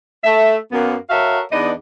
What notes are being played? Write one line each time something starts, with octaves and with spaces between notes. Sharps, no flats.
A3 E5
F#2 A#3 B3
F#4 A4 A#4 C#5 E5 F5
E2 B3 D4 D#4 D5 D#5